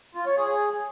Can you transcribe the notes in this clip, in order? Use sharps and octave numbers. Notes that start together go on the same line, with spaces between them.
F4
C#5
G#4